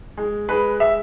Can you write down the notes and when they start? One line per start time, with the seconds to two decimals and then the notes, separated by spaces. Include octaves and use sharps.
0.17 G#3
0.49 G#3 B4
0.80 G#3 E5